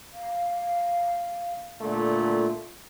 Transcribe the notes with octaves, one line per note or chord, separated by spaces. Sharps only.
F5
A#2 D3 A3 F4